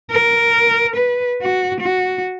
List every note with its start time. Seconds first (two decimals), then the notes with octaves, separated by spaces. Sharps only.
0.11 A#4
0.96 B4
1.42 F#4
1.81 F#4